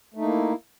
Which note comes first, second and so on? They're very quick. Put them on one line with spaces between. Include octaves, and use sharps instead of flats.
A3 D#4 A#3 E4